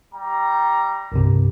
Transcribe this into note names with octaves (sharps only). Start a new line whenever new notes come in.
G3 G5 A#5
C2 G2 C3